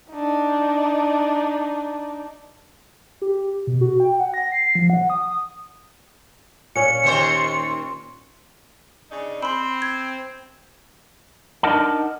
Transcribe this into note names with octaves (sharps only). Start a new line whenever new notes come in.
D4 D#4
G4
B2
F#4
G5
F#5
A#6
C7
F3
F#5
D#6
A#2 C#4 C#7
D#2 C5 C#5
C#3 D4 D#4
C4 B5 C6
G#6
D4 D#4 A#4 D#5 F#5 A5